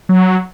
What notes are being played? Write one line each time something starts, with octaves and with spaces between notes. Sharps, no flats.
F#3